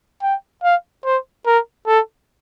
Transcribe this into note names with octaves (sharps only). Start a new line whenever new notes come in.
G5
F5
C5
A#4
A4